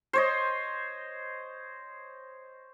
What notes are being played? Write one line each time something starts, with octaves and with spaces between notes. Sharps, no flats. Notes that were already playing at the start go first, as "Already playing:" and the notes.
C5 C#5 D#5